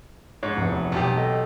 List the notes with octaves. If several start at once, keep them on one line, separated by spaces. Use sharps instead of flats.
G#2 C#5
F1 E2
B1 G4
A4 D#5 G5